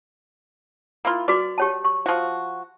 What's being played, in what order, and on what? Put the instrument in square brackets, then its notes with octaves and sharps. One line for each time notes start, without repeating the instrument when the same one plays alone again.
[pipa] A#3 E4 F4
[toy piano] F#4 B4 D6 [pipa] D5
[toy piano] G4 C#5 A5
C#6
[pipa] F3 F#4